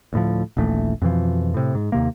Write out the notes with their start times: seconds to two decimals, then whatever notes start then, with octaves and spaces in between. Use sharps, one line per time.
0.13 D2 A2 F3
0.57 D#1 A#1 E3 A3
1.02 F2 B2 E3 F3
1.54 A2 C3
1.75 G#2
1.92 D#2 C3 A#3